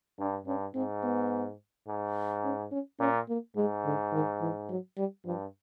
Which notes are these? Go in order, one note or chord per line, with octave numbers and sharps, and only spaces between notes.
G2 D4
G2 C#4
G#2 C4
B3
G#2
C#4
C#4
A#2 C#4
A#3
G#2 G#3
D3
D#3
E3
F#3
G3
G2 F3